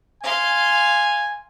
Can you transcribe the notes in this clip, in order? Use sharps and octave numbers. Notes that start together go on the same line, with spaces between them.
F5 G#5 C6